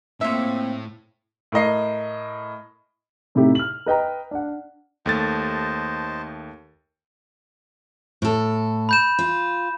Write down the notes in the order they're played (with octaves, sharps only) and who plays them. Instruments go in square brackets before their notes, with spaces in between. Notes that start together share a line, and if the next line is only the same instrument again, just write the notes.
[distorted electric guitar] A2 [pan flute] A#3 [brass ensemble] C4 [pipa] F4 E5
[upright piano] A2 A#4 D#5 C7
A2 C3 D#4 E4 G4
F6 F#7
B4 D#5 G5 A#5
D4 F#5
[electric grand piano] D#2 A3 A6 [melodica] C5 D#5 A5
[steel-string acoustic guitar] A2 A4
[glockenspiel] B5 G6 E7
[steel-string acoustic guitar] F4